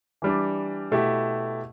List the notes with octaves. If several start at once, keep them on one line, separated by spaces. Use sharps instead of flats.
E3 G3 D4
B2 A3 E4 G4